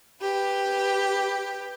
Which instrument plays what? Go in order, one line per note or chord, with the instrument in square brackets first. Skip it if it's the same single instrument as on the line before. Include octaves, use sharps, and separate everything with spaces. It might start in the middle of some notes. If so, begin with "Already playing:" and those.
[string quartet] G4 B4